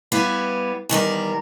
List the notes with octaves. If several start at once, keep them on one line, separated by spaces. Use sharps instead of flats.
G3 B3 E4 F5
E2 D#3 G3 A#4